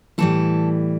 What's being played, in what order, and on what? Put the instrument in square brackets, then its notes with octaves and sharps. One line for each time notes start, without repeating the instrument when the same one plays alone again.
[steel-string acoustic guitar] A2 E3 G3 A4